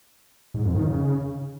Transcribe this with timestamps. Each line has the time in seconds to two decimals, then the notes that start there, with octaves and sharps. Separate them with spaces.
0.54 G#2
0.65 F2
0.75 D#3
0.86 C#3